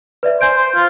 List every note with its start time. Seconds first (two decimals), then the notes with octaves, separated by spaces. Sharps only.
0.23 B4 D5 E5
0.41 C5 G#5 G6 D7
0.57 C5
0.75 F4